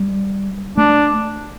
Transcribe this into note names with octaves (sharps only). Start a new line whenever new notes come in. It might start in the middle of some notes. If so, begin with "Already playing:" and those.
Already playing: G3
A3 D4